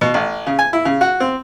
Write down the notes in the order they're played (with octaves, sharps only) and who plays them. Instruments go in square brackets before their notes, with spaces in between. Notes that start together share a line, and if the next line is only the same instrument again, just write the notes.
[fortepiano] B2
A1
C#3
G#5
E4
C#3
F#4
C4